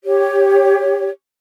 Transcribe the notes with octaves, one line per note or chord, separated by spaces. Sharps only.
G4 C#5